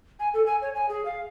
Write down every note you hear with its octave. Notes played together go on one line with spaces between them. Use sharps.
G#5
A4
G#5
C#5
G#5
G#4
F5